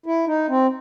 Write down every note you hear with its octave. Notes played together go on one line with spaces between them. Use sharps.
E4
D#4
C4